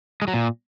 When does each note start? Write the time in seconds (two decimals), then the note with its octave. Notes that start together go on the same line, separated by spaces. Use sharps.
0.22 G#3
0.28 F#3
0.34 A#2